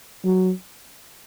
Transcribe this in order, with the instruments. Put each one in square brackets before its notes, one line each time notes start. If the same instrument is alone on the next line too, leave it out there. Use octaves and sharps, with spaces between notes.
[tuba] F#3